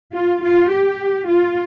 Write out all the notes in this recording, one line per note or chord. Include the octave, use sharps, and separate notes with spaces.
F4
F4
G4
F4